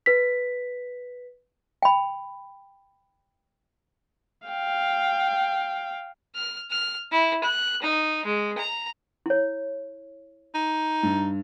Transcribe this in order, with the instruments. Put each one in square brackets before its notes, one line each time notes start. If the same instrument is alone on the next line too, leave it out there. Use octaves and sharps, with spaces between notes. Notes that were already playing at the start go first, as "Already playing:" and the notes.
[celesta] B4 B6
[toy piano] G5 B5
[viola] F5 G5
[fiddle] F6
F6
E4
F#6
D#4
G#3
A#5
[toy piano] E4 C#5
[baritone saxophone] D#4
[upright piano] G2